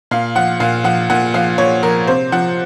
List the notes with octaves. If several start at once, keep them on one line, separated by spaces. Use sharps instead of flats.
A#2 F5
F3 F#5
A#2 F5
F3 F#5
A#2 F#5
F3 F5
A#2 C#5
F3 A#4
C3 C5
F3 F#5